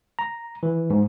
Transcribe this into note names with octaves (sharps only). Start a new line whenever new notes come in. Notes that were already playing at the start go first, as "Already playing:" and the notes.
A#5
E3
G#2